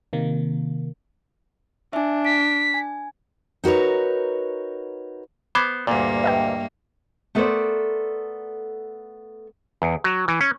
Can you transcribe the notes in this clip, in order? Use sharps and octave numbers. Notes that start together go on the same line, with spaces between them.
C3 D#3 A#3
D4 E5 G#5
B6 D7
G#5
D#4 F#4 A#4 B4 C#5
B3 C5 B5 D6 G#6
D2 G2 A#2 A#3 D5
B4 D#5 E5 G5
A3 B3 A4 A#4 C5 D5
E2
F#3
E3
C#4